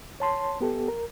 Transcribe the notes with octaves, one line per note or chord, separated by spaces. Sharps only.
C#5 A5 C6
B3 G4 A4
A#4